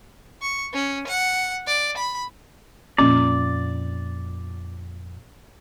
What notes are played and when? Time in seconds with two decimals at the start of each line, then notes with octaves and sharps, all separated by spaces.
0.42 C#6
0.74 C#4
1.08 F#5
1.67 D5
1.97 B5
2.98 F2 A#2 C#4 D5